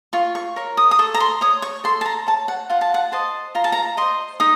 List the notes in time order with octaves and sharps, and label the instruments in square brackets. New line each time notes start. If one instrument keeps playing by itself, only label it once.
[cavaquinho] F4 C#6
C#6
A#4 C#5
D#6
D#6
A4 C#6
A#5
C6
C#5 D#6
C#6
A4 C6
A5
A#5
C#5 A5
F#5
F4 F#5
A5
F#5
C5 D#5 A5
F4 A#5
A5
A#5
C5 D#5 C6
D#4 D#6